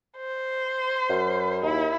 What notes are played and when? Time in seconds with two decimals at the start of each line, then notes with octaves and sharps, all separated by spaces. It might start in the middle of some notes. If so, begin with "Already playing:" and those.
0.18 C5
1.10 F#2
1.63 D#2 E4